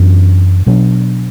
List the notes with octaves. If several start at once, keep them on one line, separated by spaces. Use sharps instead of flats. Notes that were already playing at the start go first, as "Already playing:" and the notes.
Already playing: F#2 E3 B3 D4
B2 F#3 B3 D4